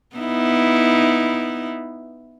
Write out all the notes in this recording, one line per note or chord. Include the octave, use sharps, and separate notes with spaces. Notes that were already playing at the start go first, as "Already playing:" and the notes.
B3 D#4 E4